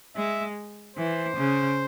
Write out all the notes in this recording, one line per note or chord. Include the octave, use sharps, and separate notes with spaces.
G#3 E5
E3 C5
C#3